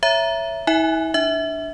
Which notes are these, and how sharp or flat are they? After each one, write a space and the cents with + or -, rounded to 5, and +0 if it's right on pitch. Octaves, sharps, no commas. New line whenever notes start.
C#5 +0 E5 +10 A#5 +15
E4 -45 E5 -15 G#5 -15
D4 +0 E5 -20